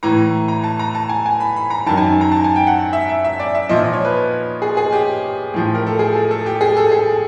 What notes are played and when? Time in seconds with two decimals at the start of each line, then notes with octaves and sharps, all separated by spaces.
0.03 A2 E3 A#5
0.48 A#5
0.64 A5
0.79 A#5
0.95 A5
1.09 G#5
1.26 G#5
1.40 B5
1.56 B5
1.70 A#5
1.86 F#2 D#3 A5
1.97 G#5
2.21 A#5
2.32 A5
2.44 G#5
2.56 G5
2.67 F#5
2.93 E5
3.09 E5
3.24 E5
3.39 D5
3.55 E5
3.69 A#2 F3 D#5
3.93 C#5
4.05 B4
4.62 G#4
4.77 G#4
4.92 G4
5.54 A2 F3
5.75 A#4
5.87 A4
5.99 G#4
6.15 A4
6.31 A4
6.46 G4
6.61 G#4
6.77 A4
6.91 G#4